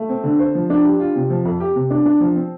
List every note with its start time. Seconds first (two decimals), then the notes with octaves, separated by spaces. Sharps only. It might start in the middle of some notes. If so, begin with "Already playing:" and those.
Already playing: A3
0.09 C4
0.24 D3
0.39 C5
0.55 F3
0.70 D4
0.84 G4
0.99 F4
1.16 C3
1.30 F3
1.45 F2
1.60 G4
1.76 C3
1.90 D4
2.05 D4
2.20 F3
2.35 C4